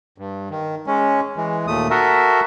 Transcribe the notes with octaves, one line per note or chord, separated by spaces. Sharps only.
G2
D#3
G#3 C#4
E3 G#3
D#2 A#2 A3 D#6
F#4 A4 A#4 E5